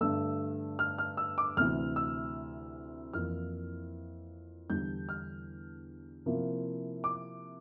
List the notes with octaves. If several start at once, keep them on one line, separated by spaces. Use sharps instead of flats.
G2 D3 A3 D4 E6
F6
F6
E6
D6
D2 C3 E3 F6
E6
F2 E3 A#3 E4 F6
E2 D3 G3 D4 G6
F6
C3 F3 A#3 E4
D6